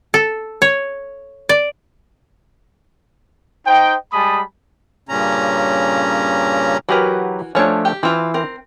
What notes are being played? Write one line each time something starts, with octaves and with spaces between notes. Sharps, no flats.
A4
C#5
D5
D#4 C5 D#5 G5
G3 G#3 G#5 A5 B5 D#6
G2 A#2 C#3 C#4 A#5
E3 F#3 F#4 G4 A#4 B4
F3 A3 C#4 D4 C#5
G4
E3 C4 F4
C4 A#4